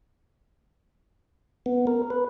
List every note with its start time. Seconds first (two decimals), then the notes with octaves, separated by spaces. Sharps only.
1.66 B3
1.87 A#4
2.10 B4